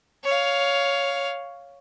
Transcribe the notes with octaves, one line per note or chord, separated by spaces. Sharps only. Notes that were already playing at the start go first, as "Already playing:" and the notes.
C#5 F5